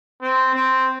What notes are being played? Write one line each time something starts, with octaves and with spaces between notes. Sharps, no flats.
C4
C4